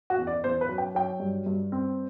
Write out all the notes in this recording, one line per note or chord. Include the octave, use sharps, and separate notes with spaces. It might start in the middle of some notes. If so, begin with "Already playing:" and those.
F#4
E2
D5
E2 C5
B4
F#3
G5
F#3 G5
G2
G2
C4